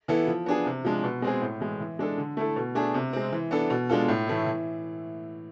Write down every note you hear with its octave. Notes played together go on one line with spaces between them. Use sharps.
E3 B3 E4 A4
F3
B3 D4 G#4
C3
F3 G#3 D4
B2
G#3 C4 G#4
A2
E3 G#3
E3
G#3 D4 A4
D3
A3 E4 A4
B2
A3 D4 G#4
C3
G#3 C4
E3
B3 D4 A4
B2
G#3 D4 F4 A4
A2
E3 A3 E4
E3